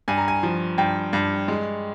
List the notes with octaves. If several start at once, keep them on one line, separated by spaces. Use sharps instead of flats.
G2 G#5
A#5
G#5
F3
G2 G5
G2
G#3